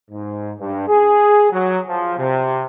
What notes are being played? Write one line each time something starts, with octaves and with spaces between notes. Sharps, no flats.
G#2
G2
G#4
F#3
F3
C3